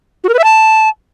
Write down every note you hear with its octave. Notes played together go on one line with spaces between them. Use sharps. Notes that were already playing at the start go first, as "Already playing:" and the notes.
F#4
A#4
B4
E5
A5